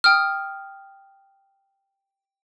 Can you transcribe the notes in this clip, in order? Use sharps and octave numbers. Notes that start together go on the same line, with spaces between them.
G5 D#6 F6